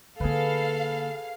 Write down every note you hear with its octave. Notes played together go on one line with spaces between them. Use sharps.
D3 A#3 G#4 A4 B4 F5